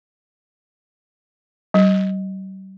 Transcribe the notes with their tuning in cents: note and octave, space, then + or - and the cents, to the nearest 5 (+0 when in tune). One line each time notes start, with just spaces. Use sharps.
G3 -45